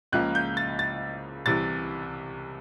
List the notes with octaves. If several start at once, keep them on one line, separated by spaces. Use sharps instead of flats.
C#2 C#3 F3 A#3 F#6
G6
A6
A6
C2 C3 E3 A6